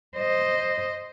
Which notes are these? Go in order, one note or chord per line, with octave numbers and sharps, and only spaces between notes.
C5 D#5